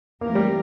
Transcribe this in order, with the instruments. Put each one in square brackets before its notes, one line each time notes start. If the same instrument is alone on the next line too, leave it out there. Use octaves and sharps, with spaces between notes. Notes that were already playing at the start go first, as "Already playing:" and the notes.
[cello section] E3 A3 C4 G4 A#4 [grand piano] A#3
[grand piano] G3